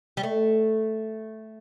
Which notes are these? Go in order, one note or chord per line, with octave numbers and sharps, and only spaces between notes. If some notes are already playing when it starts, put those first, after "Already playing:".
G3
A3